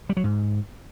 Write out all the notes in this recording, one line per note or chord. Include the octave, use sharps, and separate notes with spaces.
G3
F#3
G#2